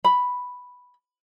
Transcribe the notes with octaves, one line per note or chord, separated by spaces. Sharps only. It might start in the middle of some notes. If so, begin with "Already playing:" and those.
B5